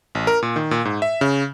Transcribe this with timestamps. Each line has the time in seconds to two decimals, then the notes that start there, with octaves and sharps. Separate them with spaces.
0.15 A1
0.27 A#4
0.42 A#2
0.56 D#3
0.71 A#2
0.85 G#2
1.02 E5
1.21 C#3